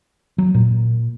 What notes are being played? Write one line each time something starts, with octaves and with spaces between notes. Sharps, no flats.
F#3
A#2